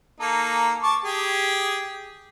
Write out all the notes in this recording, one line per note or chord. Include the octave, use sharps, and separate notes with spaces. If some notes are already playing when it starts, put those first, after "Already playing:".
A#3 D#4 A4
A5 C#6 D6
G4 G#4